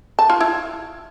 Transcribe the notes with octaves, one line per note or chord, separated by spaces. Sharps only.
A5
F4
E4